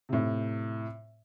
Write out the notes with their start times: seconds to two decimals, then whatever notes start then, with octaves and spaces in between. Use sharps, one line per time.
0.09 A2 C3